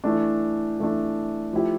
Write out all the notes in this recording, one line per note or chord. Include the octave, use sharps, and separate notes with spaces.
E3 A3 D4
E3 A3 D4
F3 A3 E4 G4